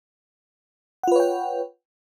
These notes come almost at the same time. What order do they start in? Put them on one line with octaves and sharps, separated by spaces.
F#5 F4 B4 C#5 G5